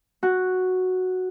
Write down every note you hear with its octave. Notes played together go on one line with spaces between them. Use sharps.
F#4